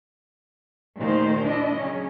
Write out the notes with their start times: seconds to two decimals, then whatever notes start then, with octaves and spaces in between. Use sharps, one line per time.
0.97 D#2 A#2 D#3 A3 C5
1.43 D4 E4 D#5
1.77 C#3 F#3 C#4